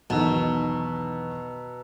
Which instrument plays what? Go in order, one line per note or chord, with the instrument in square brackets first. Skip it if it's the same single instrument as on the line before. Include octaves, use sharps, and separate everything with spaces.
[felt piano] B1 E2 D#3 [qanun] B2 [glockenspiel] A5 A#5 E6